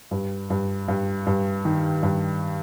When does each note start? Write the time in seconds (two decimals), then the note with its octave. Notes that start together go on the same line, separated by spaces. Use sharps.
0.11 G2
0.50 G2
0.88 G2
1.26 G2
1.65 D#3
2.03 G2